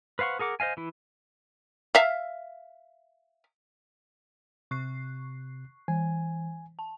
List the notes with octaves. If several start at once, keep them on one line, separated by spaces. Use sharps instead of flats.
B4 C5 F5 F#5 C#6
G#4 A#4 F#5 D6
C5 D#5 F5 G#5
E3 E4
E5 F5
C3 C#6 F#6 C7
E3 G#5
A5